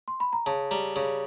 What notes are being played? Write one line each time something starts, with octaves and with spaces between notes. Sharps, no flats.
C6
B5
A#5
C#3 A5
G3 A#5
C#3